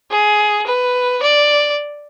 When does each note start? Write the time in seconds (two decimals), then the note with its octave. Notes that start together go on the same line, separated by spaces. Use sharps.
0.10 G#4
0.66 B4
1.22 D5